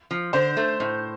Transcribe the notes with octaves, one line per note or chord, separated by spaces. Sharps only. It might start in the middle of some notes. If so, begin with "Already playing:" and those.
F3
D3 C5
A3
A2